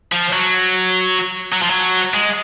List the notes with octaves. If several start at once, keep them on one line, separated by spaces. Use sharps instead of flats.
F3
F#3
F#3
F3
F#3
G#3